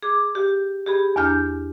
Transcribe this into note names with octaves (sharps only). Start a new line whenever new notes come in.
G#4 D6
G4
G4 G#4 B5
E2 D4 F6 G6